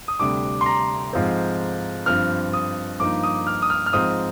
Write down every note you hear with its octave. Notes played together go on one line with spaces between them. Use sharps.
D#6
D2 C3 G3 D4 D6
C6
A#5
G#2 F3 C4
G2 F3 C4 F6
D#6
G2 F3 A#3 D#4 D6
D#6
F6
D#6
F6
F6
G#2 F3 C4 D#6